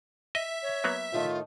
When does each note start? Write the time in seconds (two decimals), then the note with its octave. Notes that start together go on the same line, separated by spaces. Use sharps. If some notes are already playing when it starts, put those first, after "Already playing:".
0.35 D#5 E5
0.62 C#5
0.84 F#3 A#3 B3
1.12 A2 D#3 A3 F4